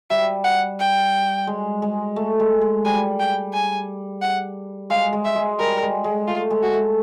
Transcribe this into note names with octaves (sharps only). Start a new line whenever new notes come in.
G3 E5
F#5
G5
G#3
G#3
A3
G#3
G#3
G3 G#5
G5
G#5
F#5
G#3 F5
G#3
E5
G#3
G3 A#4
G#3
G#3
A3 F4
G#3
F#4
A3